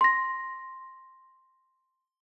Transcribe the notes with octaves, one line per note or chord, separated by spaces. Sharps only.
C6 A#6